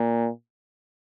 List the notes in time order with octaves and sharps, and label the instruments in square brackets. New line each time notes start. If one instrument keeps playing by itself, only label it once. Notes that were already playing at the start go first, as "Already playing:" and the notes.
Already playing: [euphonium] A#2